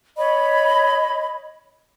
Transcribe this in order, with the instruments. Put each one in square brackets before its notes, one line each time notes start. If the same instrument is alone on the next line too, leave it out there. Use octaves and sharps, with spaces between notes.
[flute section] C#5 D#5 B5